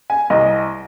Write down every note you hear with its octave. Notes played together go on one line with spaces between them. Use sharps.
G#5
C2 D#5